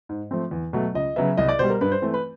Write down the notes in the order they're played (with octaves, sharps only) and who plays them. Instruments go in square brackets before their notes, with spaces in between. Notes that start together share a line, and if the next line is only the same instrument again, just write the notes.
[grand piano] G#2
F3 A3 C4
E2
B2 F#3 A3
C#2 D#5
C#3 F#3 B3 E5
C2 D#5
D5
B2 G3 C5
A#4
G2 B4
C5
E3 A3 C4
B4